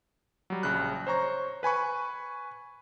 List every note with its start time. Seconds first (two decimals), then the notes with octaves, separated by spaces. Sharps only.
0.50 F#3 G3
0.63 A#1 C#3 F#6
1.07 C5 C#5 A#5 C#6
1.63 B4 G#5 B5 C#6